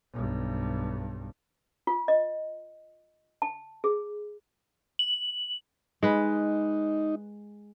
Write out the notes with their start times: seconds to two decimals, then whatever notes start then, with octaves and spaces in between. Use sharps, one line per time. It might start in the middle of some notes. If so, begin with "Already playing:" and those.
0.13 B1 G2
1.87 F4
2.08 D#5
3.42 A5
3.84 G#4
4.99 F#7
6.03 G#3 D#4 B4